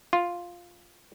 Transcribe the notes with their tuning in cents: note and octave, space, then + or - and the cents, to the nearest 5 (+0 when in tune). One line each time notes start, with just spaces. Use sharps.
F4 +0